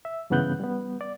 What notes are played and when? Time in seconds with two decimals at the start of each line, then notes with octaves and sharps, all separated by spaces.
0.05 E5
0.30 G2 C#3 E3 B3 F#6 G6
0.60 G3 B3
1.01 D5